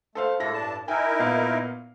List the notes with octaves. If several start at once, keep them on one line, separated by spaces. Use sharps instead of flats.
A3 A4 C5 F5
A2 G#3 A#3 E4 A4 A#6
G2 D4 A5
D#4 E4 A#4 E5 G5 G#5
A#2 B3 F5